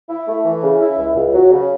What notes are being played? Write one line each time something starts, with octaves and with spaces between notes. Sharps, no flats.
E4
A3
E3
C#3
E4
C#2
C#2
F#3
C#3